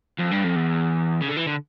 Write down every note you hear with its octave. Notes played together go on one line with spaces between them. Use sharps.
F2
G2
F2
E2
C#3
D3
E3
D3